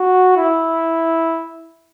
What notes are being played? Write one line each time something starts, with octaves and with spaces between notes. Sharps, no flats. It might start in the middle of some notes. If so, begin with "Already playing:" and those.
Already playing: F#4
E4